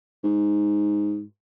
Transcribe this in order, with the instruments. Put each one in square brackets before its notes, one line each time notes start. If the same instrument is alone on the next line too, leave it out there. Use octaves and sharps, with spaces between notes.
[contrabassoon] G#2